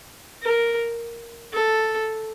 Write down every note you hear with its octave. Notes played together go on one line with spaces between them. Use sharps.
A#4
A4